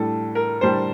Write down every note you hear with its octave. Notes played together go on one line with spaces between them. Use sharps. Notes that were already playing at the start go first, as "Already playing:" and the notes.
Already playing: A2 G3 D4 A4
A#4
A2 G3 D4 C5